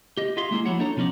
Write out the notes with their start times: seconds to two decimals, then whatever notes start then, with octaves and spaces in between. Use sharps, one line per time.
0.17 G4 D#5
0.37 F4 G#4 E5 F5 C6
0.51 G#3 A#3 E4 G#4
0.65 F3 A#3 E4 F#4 C#5 F#5
0.79 D4 D#4 A4 C#5 A#5
0.97 B2 F3 C#4 D#4 D5